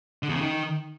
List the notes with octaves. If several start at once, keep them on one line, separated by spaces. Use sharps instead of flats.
D3
E2
C#3
D#3